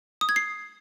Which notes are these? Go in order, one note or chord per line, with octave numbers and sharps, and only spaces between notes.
D#6
G#6
C7